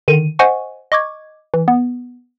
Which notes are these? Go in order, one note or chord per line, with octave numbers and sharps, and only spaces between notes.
D3 D#3 D#7
C5 D#5 F#5 G#5 C#6
D#5 C#6 D6 G#6
E3
B3